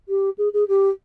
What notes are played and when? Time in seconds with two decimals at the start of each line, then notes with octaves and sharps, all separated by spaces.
0.08 G4
0.38 G#4
0.53 G#4
0.68 G4